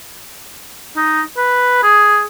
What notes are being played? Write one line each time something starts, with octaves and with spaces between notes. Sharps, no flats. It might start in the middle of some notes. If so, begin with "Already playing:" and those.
D#4
B4
G#4